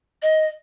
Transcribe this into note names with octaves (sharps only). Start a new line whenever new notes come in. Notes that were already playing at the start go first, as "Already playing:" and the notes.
D#5